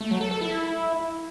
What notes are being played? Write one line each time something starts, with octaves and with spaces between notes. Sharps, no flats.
A3
F#3
A4
A4
E4